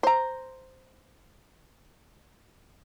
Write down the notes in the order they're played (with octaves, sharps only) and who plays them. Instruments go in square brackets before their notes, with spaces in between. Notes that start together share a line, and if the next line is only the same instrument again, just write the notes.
[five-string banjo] C5 A#5